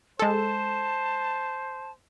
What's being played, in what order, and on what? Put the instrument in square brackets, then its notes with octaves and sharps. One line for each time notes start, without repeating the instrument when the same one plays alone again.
[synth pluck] G#3 A4 [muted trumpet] C5 [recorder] A5